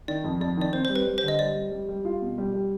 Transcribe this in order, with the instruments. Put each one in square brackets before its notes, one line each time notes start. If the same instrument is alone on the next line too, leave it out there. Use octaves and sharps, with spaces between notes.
[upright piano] D#3 [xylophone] D5
[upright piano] F2
[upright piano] F2 [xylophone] D5
[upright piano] D#3 [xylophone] D5
[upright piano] C4 [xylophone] C5
[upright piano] G3 [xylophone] C5
[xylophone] B4
[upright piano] G3
[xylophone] C5
[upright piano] D3
[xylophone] D#5
[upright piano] G3 [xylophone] D5
[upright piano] G3
G3
G3
F4
B2
G3
G3